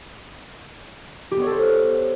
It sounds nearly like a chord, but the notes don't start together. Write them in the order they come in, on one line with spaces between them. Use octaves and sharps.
G4 B3 C#5 A4 C5